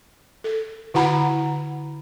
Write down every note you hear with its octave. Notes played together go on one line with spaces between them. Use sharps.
A4
D3 E4 F#4 F#5 A#5 B5